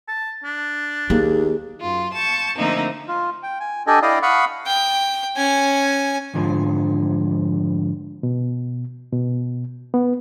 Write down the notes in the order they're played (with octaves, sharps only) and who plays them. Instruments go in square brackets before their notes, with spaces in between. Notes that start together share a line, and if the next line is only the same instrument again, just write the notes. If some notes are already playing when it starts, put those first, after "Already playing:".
[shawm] A5
D4
[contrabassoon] D#2 [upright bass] A#3 [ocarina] G#4
[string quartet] F#2 F4
A5 C#6 G6
D3 F3 A3 A#3 C4 D#4
[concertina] F4
G5
G#5
D4 G4 A4 D5 D#5 G#5
E4 D5 D#5 F5 G5 D#6
F5 F#5 B5 C#6 D#6
[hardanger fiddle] G5
C#4 G#5
[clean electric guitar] F2 G#2 D3 F3
[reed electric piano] B2
B2
B3